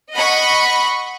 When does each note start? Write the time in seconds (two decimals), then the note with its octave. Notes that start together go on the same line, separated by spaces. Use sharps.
0.13 D#5 F#5 B5 C#6